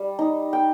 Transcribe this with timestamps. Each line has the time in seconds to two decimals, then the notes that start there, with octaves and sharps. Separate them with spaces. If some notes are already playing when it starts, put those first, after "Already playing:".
Already playing: G3
0.19 D#4
0.53 G5